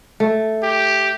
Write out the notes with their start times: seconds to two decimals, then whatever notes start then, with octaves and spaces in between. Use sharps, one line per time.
0.20 A3
0.63 G4